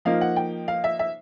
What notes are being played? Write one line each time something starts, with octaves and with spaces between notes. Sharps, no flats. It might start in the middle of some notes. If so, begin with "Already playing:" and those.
F3 A#3 D#4 F5
F#5
G5
F5
E5
E5